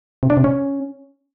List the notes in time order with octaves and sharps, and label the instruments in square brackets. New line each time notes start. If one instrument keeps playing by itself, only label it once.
[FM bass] C3
D4
C3
C#4